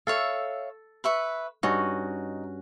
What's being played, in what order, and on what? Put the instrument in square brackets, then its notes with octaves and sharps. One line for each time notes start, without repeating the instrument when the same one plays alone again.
[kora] A4 [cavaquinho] C#5 E5 F5
[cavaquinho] B4 E5 C#6
[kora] G2 C#4 F#4 [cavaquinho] D#4